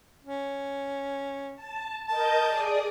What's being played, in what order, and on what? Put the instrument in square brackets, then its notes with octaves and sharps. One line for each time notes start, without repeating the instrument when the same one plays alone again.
[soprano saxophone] C#4
[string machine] A5
[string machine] A#4 D#5 G6 [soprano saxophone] A5
[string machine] G#4 D5 D#6